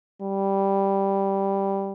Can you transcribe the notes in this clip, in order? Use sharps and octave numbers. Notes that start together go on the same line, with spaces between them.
G3